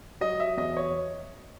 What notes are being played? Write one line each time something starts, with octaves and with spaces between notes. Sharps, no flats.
F#3 D#5
E5
E2 D#5
C#5